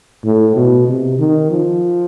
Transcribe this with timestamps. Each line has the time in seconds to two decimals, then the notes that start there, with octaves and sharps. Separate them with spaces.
0.25 A2
0.56 B2
0.88 C3
1.19 D#3
1.51 F3